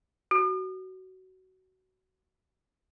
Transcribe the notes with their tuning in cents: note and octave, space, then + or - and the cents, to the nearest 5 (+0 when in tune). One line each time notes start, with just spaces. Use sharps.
F#4 +20